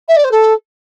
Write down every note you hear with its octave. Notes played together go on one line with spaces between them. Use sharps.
E5
D5
C5
A4